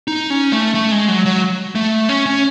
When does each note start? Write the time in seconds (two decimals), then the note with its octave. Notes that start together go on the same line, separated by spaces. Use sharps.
0.08 D#4
0.30 C#4
0.53 A3
0.75 A3
0.91 G#3
1.08 F#3
1.26 F#3
1.75 A3
2.09 C#4
2.26 C#4